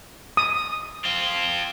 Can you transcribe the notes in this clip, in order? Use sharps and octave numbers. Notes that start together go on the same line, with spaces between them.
D#6
C4 F4